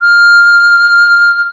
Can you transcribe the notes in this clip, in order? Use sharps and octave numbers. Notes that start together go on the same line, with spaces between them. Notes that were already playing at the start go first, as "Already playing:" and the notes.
F6